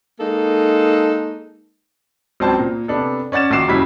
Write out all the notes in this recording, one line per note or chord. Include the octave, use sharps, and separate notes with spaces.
G#3 A#3 D#4 A4
C#2 F#3 C4 C5 D5 A5
A#2
C3 B3 D4 A4
C#4 D5 F#5 A6 E7
A#1 D#3 F#4 D6 C7 E7
F#1 C#3 F#3 G3 E4 B6